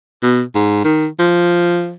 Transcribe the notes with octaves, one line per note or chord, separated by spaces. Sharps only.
B2
G#2
D#3
F3